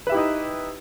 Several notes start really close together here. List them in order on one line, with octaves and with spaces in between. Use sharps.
B4 E5 G4 E4 D#4